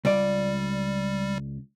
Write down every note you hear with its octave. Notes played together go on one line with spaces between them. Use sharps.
C#2 G3 D5